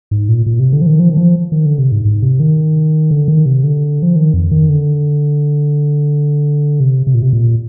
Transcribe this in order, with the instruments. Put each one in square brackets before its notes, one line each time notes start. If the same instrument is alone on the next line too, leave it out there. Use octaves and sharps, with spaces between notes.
[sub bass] G#2
A#2
A#2
C3
D3
F3
D#3
F3
D#3
F3
D#3
D3
C3
G#2
G#2
C3
D#3
D3
D#3
C3
D3
F3
D#3
F2
D#3
D3
C3
C3
A#2
C3
A#2